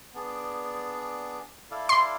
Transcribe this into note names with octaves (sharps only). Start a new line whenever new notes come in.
B3 D4 G#4 D5
E4 A4 D5 F5
C6